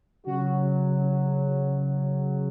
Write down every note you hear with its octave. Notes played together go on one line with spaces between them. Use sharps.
C#3 F#3 F#4
F#4